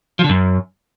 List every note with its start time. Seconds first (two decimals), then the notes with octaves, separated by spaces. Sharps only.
0.19 F3
0.24 D3
0.29 F#2